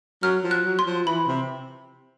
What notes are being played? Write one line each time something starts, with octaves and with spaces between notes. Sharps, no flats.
F#3 F6
F3
F#6
F#3
C6
F3
E3 B5
C3